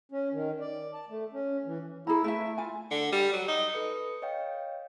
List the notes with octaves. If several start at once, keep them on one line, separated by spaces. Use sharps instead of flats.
C#4
D#3
D5
A5
A3
C#4
E3
E4 G#4 A#5
A3 E4 B4 E5
F4 G#5
D3
G3
F#3
D#4
A4 B4 D#6 C#7
C#5 D#5 F5 G5